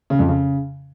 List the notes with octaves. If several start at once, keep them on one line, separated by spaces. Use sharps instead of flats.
C#3
F2
C#3